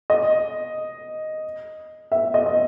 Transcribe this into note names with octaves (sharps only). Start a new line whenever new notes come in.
D#5
E5
D#5
D#5